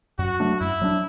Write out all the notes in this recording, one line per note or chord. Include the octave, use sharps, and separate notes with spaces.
F#2 F#4
F#3 A3 D4
F#2 E4
F#3 A3 D4